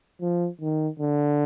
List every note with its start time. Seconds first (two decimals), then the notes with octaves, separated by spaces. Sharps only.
0.22 F3
0.61 D#3
1.00 D3